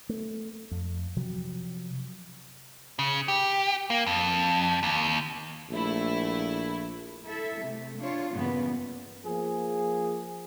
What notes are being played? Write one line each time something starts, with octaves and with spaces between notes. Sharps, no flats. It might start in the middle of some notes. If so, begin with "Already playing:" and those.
A3
F2
C3 F3 F#3
C#3
G4
A#3
F2
D#2
A#1 A3 E4
E4 A4 E5
C3 A3
D4 F4 C#5
G2 A#2 C#3 E3 B3
F3 A#3 G#4